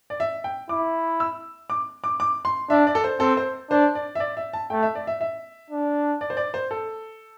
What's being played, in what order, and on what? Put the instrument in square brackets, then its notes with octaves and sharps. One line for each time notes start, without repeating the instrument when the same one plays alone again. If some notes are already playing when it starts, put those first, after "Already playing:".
[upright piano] D5
E5
G5
[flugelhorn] E4 [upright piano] D6
[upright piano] E6
D6
D6
D6
C6
[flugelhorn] D4 [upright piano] E5
[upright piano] D5
A4
C5
[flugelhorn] C4 [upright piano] A4
[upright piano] C5
[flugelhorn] D4 [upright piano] C5
[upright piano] D5
E5
D5
E5
A5
[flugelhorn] A3 [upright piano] G5
[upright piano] E5
D5
E5
E5
[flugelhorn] D4
[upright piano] D5
C5
D5
C5
A4